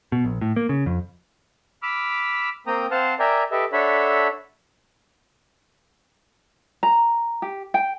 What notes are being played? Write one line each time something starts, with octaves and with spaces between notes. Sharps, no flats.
B2
A#1
A2
A#3
C#3
F2
B5 D6 E6 F6
A#3 C4 G5 A#5 D#6
C4 C5 F5 F#5 A5 F6
A#4 D5 E5 G5 G#5 A#5
G4 A4 B4 D#5 E5
D4 A4 C#5 E5 F#5 B5
A#5
G4
G5